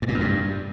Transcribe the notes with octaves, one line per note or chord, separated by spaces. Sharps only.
G2
A#2
F#2
G2